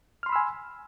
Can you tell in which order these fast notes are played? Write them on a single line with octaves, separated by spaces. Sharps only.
F6 C6 B5 E6 G#5